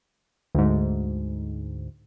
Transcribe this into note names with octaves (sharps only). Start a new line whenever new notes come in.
D2 G#2